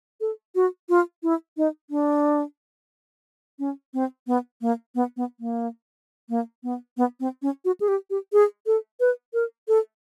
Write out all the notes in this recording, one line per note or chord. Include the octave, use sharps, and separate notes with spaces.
A4
F#4
F4
E4
D#4
D4
C#4
C4
B3
A#3
B3
B3
A#3
A#3
B3
B3
C4
C#4
F#4
G#4
G4
G4
G#4
A4
B4
A#4
A4